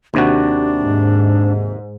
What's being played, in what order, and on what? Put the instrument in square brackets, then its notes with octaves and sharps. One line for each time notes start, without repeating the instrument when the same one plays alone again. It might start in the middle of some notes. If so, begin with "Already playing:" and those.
[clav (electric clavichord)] D#2 C3 F#4 [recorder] D4
[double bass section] G#2